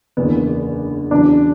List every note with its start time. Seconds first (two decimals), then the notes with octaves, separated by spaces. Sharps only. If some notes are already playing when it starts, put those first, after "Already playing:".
0.17 F#1 E2 D3 B3
1.11 E2 C#3 F#3 D4